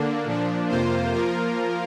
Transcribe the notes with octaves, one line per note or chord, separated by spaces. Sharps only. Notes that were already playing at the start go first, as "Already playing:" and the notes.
Already playing: D3 A#3 D4
A#2 F3 D4
F2 C3 A#3 F4 C5
F3 A#3 F4 A#4